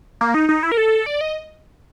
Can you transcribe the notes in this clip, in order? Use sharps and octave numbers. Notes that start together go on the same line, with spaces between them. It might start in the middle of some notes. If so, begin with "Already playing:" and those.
A#3
D#4
D#4
E4
A#4
A4
D5
D#5